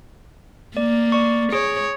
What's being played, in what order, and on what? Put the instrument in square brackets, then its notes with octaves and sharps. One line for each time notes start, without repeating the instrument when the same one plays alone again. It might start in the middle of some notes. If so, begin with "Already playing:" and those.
[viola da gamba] A#3 [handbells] D5
[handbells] D5 C#6
[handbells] G#4 [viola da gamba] C#5